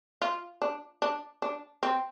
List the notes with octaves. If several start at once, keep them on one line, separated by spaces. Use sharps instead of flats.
F4
D4
D4
D4
C4